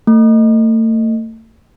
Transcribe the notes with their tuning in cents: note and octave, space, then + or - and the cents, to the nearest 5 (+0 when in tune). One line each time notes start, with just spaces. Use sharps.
A3 +35